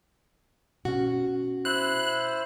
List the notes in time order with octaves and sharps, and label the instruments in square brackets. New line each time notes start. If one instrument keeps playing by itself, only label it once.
[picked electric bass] B2 C#4 [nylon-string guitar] F#4
[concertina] E4 C5 [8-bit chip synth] F#6